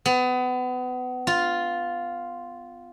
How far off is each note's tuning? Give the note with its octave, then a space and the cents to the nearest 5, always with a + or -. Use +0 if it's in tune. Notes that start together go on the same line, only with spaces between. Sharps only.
B3 +30
F4 +0